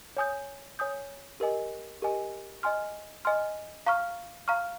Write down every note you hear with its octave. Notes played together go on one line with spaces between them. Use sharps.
C#5 G#5 D#6 G6
C#5 G#5 D#6 G6
G4 A#4 D#5 G#5
G4 A#4 D#5 G#5
D#5 G#5 C6 F6
D#5 G#5 C6 F6
F5 A#5 C#6 F6
F5 A#5 C#6 F6